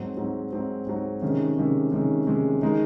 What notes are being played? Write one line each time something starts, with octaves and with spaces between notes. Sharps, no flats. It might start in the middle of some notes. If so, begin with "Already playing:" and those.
Already playing: G#2 F#3 C4
G#2 F#3 C4
G#2 F#3 C4
G#2 F#3 C4
C3 D#3 G#3 C#4
C3 D#3 G#3 C#4
C3 D#3 G#3 C#4
C3 D#3 G#3 C#4
D#3 G#3 D#4